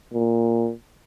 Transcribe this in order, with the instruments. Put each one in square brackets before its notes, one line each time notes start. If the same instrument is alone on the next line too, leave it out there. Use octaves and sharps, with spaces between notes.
[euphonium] A#2